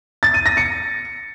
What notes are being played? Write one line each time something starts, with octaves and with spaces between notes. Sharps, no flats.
A6
D#7
A#6
C#7